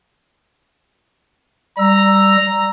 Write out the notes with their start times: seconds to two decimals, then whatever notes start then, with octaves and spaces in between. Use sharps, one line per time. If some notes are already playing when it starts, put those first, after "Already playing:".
1.78 G3 A#5 E6